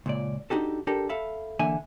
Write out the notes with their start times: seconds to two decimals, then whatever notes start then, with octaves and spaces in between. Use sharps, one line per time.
0.06 C#2 A#2 D5
0.50 D4 D#4 F#4 G4 A4
0.87 D4 G4 A4 A#4
1.09 A4 E5 F5 B5
1.59 D3 E3 A#3 E5 G#5